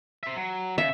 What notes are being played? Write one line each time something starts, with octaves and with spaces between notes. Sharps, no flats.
C5 E5
F#3
C#3 E5